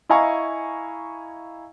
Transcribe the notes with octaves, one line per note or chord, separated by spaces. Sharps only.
E4 D#5 F5 G#5 A#5 C#6